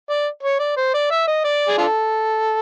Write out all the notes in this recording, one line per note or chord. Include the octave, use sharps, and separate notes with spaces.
D5
C#5
D5
C5
D5
E5
D#5
D5
G#4
D4 F4 A4